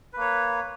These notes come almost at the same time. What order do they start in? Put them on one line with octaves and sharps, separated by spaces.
B4 A#3 C#5